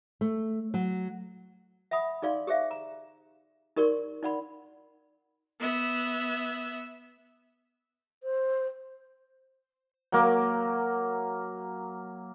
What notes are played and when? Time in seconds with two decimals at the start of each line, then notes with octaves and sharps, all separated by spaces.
0.21 A3
0.74 F#3
1.91 E5 F#5 B5 D#6
2.22 D#4 G#4 D5 F5 C6
2.47 G4 G#4 C5 E5 F5
2.71 A#5
3.76 D#4 G4 A#4 D5 C6 C#6
4.23 D#4 D5 F#5 B5 C6
5.60 B3 E5
8.23 C5
10.12 F#3 A#3